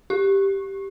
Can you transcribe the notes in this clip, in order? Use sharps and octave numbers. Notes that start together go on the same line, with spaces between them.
G4